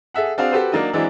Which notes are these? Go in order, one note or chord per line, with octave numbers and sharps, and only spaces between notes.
G#4 A4 E5 F#5
C4 D4 F#4 G#4 F5
F#4 G4 A4 B4 C5
F#3 A#3 D4 D#4 D#5
E3 F#3 G#3 C4 D4 E4